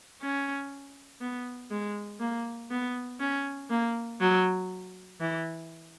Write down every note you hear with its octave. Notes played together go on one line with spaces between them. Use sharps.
C#4
B3
G#3
A#3
B3
C#4
A#3
F#3
E3